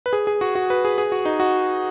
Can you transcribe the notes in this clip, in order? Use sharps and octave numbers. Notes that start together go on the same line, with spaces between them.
B4
G#4
G#4
F#4
F#4
B4
G#4
G#4
F#4
D#4
F#4